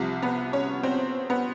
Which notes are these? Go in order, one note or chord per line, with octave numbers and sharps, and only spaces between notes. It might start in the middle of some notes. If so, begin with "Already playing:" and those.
Already playing: C2 C3 F3
B3 B4
C#4 C#5
C4 C5
B3 B4